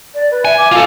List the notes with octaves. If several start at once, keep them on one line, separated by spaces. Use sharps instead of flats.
D5
B4
E5 G#5
D6
F4 A4